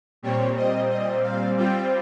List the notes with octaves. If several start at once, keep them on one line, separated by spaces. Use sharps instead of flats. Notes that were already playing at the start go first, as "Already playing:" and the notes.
A#2 G3 C4 C#5
D#5
D#5
F5
G3 C4 F4 G5